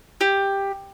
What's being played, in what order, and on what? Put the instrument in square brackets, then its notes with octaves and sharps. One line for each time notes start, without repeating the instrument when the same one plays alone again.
[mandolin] G4